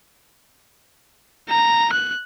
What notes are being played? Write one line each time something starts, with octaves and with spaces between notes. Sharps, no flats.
A#5
F#6